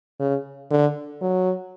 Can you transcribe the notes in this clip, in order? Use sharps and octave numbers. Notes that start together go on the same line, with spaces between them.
C#3
D3
F#3